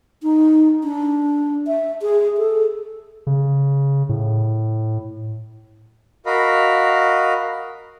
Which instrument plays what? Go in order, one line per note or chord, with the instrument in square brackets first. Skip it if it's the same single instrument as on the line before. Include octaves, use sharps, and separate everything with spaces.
[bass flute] D#4
D4
E5
G#4
A4
[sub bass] C#3
A2
[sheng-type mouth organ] F#4 A#4 D#5 F5 B5